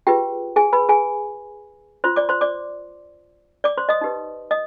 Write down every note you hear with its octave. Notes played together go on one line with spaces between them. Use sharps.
F4 G4 G#4 B4 G5
G#4 G#5
B4 B5
G#4 G#5
F4 C5 C6
D5 D6
C5 C6
D5 D6
D5 D6
C5 C6
D#5 D#6
D#4 G4 B4
D#5 D#6